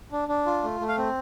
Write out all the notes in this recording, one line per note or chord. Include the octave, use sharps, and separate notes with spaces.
D4
D4
F4
A3
A3
F5
C4